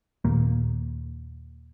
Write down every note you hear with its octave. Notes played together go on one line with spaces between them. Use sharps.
D#2 A#2 A#3